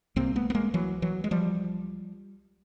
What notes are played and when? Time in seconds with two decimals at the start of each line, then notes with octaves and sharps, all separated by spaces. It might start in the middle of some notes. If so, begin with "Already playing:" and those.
0.16 C2 C3 A#3 C4
0.36 A3 B3
0.50 B3
0.55 G#3 A#3
0.74 E3 F#3
1.02 E3 F#3
1.24 G#3
1.31 F3 G3